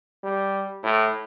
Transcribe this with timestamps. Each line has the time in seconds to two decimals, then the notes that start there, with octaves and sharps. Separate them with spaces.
0.23 G3
0.83 A2